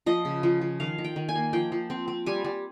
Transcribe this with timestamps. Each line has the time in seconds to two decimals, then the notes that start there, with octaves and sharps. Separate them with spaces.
0.06 F3 D#5
0.25 C#3
0.43 F3
0.61 F3
0.80 D#3 F5
0.98 D#3
1.04 G5
1.16 D#3
1.29 G#5
1.35 A#3
1.53 F3 G5
1.72 F3
1.90 C4
2.08 C4
2.26 G3 G#5
2.44 G3